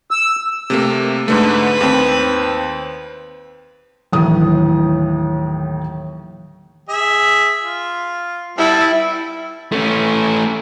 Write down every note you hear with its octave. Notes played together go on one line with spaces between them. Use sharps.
E6
C3 A3 A#3
G#2 D3 A3 B4
D#2 C4
D#2 A2 D3 E3 F#3 D#6
G#4 E5
F4
G3 B3 E4 A5
A3 C#4